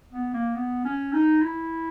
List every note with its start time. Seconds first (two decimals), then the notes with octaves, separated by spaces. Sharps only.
0.12 B3
0.34 A#3
0.55 B3
0.85 C#4
1.13 D#4
1.42 E4